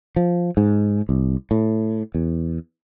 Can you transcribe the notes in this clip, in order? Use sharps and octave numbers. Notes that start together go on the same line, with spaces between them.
F3
G#2
C2
A2
E2